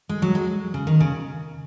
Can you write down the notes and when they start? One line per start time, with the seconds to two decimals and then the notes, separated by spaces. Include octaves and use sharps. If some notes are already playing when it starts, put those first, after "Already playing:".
0.09 G#3
0.22 F#3
0.35 G#3
0.74 C#3
0.87 D#3
1.00 C#3